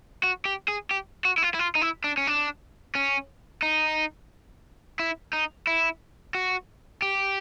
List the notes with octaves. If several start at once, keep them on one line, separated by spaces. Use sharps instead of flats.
F#4
G4
G#4
G4
F#4
E4
F4
E4
F4
D#4
E4
D4
C#4
D4
C#4
D#4
E4
D#4
E4
F#4
G4